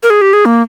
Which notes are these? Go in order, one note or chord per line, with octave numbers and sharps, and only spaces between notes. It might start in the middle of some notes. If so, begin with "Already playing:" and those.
A#4
G#4
G4
G#4
A#3